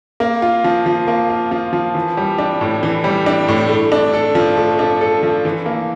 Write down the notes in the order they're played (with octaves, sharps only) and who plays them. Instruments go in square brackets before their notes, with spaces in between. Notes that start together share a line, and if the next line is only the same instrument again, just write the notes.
[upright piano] A#3
F4
F3
F3
A#3
F4
F3
F3
E3
G3
D4
A2
E3
G3
D4
A2
A3
D4
A4
F3
A3
D4
A4
F3
E3
A#3